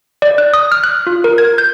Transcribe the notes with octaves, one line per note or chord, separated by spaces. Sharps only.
D5
F#6
D#6
F6
F#6
F4
A#4
G#6
G6